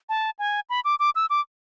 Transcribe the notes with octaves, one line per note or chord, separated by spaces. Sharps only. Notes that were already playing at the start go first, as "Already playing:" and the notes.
A5
G#5
B5
D6
D6
E6
D6